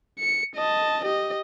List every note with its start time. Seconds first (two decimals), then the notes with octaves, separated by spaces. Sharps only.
0.19 C#7
0.56 D#5 A5
1.05 G4 D#5